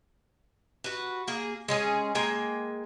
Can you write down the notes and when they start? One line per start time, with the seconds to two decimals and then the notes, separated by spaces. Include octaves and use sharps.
0.84 F#4 B4
1.28 A#3 G#4
1.68 G#3 C#4 G#4
2.15 G#3 A#3 G5 G#5